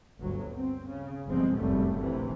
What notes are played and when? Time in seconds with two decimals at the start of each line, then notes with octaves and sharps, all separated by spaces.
0.20 G1 D2 F#3
0.54 C4
0.89 C#3
1.27 G1 E2 C3 F3 G#3 C4
1.57 F1 C2 F#2 A2 G3 A3
1.97 A#1 C3 E3